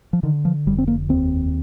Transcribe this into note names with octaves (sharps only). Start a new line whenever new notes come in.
F3
D3 D#3
F3
F1 G3
C4
A#3
D#2 C4